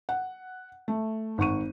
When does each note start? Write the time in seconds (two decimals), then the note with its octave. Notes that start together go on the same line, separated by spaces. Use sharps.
0.09 F#5
0.88 A3
1.38 G#1 F#5 C#6 D#7